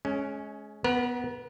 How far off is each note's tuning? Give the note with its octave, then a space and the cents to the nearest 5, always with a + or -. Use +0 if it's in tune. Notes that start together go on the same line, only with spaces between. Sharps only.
G#3 +30 C#4 +0
B3 +0 A#4 +45